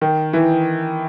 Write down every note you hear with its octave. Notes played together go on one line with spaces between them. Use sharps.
D#3
E3